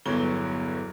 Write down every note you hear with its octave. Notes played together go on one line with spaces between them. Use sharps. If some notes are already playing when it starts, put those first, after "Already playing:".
G1 E2 F#3 C#5 G7